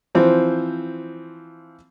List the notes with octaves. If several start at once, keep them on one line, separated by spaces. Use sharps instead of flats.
E3 F3 C4